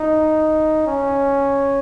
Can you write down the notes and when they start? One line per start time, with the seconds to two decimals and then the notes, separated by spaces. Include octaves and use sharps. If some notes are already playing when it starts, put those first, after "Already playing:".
Already playing: D#4
0.87 C#4